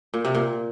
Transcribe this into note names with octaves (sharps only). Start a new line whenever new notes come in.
A#2
C3
A#2